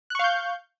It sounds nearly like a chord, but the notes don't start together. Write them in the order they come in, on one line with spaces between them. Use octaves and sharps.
F#6 C#6 F5 G6